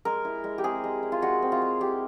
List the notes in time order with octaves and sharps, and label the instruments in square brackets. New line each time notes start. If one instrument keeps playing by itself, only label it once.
[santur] G#3 A#4
E4
G#3
G4
C4 G#4
G#3
E4
F4
G#3 F#4
C4
F4
G#3
E4 G4